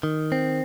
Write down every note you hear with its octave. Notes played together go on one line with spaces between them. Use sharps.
D#3
C4